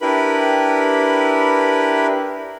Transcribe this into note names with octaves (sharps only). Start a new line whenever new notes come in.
D4 E4 G4 A#4 B4 B5